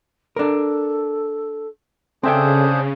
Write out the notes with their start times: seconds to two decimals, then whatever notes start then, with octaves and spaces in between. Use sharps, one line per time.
0.36 D4 A4 A#4
2.23 C#3 C4 D4 G#4 A4 C5 E5 G5